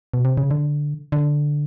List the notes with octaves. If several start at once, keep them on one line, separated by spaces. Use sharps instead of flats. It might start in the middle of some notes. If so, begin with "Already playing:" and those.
B2
C3
C#3
D3
D3